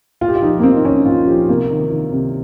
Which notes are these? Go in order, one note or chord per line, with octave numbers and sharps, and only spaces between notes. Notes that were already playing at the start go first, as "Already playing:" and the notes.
A#2 F4
G4
F4
F3 D#4
A#3
F3 C4
D#4
A#2 C#4
A#2 F4
F3 G4
C3 A#3
D#3
D#3
C3